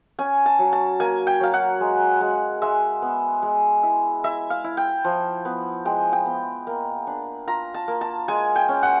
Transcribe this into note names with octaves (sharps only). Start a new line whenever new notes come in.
C#4 G#5
A5
F#3
A5
A#3 G#5
G5
F#3 F5
F#5
G#3
G#3
G#3 E5
B3
G#3
E4
E4 E5
F5
E4
G5
F3
B3
G#3 G5
G5
B3
A#3
D4
F4 A#5
A5
A#3
A5
G#3 G#5
G5
C#4
F#5